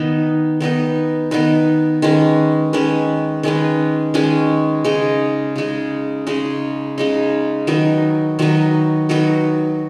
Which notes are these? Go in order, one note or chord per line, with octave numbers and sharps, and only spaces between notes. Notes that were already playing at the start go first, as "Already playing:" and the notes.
Already playing: D#3 B3 D#4 B4
D#3 B3 D#4 B4
D#3 B3 D#4 B4
D#3 G#3 C#4 B4
D#3 G#3 C#4 B4
D#3 G#3 C#4 B4
D#3 G#3 C#4 B4
C#3 G#3 D#4
C#3 G#3 D#4
C#3 G#3 D#4
C#3 G#3 D#4
D#3 F#3 D#4 B4
D#3 F#3 D#4 B4
D#3 F#3 D#4 B4